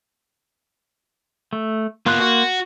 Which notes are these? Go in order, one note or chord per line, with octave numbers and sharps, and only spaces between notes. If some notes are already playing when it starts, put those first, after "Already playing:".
A3
A#3 B3 F4 C6 F#6
F#4